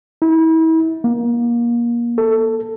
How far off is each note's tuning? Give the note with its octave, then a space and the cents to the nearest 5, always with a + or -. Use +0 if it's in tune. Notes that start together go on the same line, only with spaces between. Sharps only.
E4 -35
A#3 +25
A4 +15